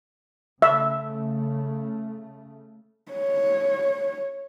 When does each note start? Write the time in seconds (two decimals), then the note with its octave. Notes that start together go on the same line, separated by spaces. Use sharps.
0.62 C#3 A3 E5
3.12 C#5